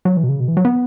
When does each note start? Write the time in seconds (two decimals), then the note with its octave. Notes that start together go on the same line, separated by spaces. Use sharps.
0.05 F#3
0.17 E3
0.23 B2
0.29 C#3
0.40 B2
0.48 E3
0.57 F#3
0.65 B3